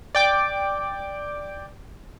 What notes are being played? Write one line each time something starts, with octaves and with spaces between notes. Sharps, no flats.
D5 G5 D6